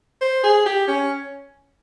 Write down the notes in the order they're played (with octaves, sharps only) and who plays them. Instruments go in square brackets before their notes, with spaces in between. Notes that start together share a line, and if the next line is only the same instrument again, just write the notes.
[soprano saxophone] C5
G#4
G4
C#4